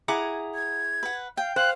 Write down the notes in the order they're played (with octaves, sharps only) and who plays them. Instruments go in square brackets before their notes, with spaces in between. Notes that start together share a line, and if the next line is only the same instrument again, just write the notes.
[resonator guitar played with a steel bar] E4 G#4 [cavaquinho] F#5 A#5 D6
[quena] G#6
[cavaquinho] B4 F#5
[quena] F5 [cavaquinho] G5
[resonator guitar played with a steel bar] C5 [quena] F5 [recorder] F#6